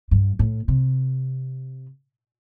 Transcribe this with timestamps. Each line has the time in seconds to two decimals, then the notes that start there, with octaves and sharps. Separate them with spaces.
0.11 G2
0.39 A2
0.68 C3